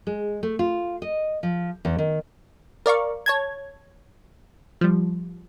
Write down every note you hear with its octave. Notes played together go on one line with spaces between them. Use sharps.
G#3
A3
F4
D#5
F3
E2
D#3
A#4 D5 F5 C#6
C#5 A5 G#6
F3 G3